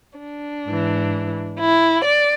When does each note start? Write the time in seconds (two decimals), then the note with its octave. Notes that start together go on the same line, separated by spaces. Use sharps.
0.19 D4
0.66 G#2 E3
1.59 E4
2.05 D5